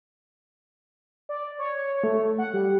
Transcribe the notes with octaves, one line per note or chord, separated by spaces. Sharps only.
D5
C#5
A3
F#5
G3